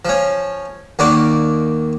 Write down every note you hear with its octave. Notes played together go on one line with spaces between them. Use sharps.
F3 C#4
D#2 A#3 D#4 F#4 D5